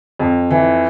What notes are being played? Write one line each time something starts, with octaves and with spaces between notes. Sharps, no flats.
F2
E3